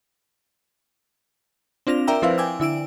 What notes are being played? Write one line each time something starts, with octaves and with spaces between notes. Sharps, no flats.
C4 D4 F4 A#6 F7
A#4 D5 E5 G5 A#5 E6
F3 C4 E4 B4 C5 F5
G5 G#5 D6 E6
D3 E4 E6 D7